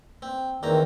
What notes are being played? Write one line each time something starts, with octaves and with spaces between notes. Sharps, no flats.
C4
E2 D#3 C4 A#5